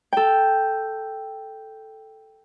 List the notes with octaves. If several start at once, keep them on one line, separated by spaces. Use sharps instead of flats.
A4 G5